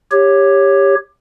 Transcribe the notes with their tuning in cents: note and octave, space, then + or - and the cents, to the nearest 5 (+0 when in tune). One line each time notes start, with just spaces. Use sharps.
G4 +15 C#5 +0